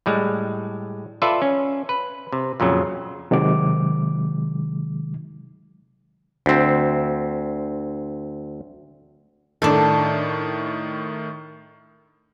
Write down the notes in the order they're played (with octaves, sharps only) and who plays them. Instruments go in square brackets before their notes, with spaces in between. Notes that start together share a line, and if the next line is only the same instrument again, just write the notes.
[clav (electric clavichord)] A2 G3 G#3
F4 A4 B4 D5 E5
C#4
B4
C3
F2 A#2 C#3 F#3
[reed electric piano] C3 D#3 F#3 G#3 D6
[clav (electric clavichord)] D2 C4
[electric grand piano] A2 D#3 [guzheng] D4 A4